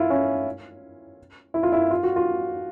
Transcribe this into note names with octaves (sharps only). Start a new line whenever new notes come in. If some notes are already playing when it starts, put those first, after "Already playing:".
Already playing: E4 F4
C#4
E4
F4
E4
F4
F#4
F4